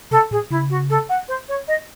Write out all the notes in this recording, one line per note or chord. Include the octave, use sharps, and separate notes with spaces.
C3 A4
A2 G#4
C#3 E4
F#4
A4
F#5
C5
C#5
D#5